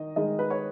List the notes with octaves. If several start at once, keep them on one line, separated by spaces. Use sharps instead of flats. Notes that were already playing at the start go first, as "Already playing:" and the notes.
Already playing: D#3 D#5
D#3 G#3 D#5
B4
C#5